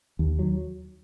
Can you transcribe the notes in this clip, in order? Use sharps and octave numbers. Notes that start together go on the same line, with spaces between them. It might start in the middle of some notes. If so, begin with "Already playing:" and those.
D#2
F#3